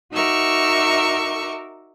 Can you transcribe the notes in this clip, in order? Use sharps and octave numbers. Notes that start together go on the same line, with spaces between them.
D#4 F#4 A#4 E5 C#6 D6